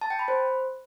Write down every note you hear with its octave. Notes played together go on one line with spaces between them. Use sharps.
A5
G5
B5
C5